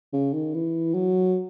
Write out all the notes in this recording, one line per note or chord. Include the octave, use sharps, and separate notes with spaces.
C#3
D#3
E3
F#3